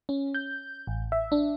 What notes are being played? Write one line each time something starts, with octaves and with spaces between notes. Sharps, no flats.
C#4
G6
A1
E5
D4